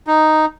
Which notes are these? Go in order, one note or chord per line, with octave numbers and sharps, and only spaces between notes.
D#4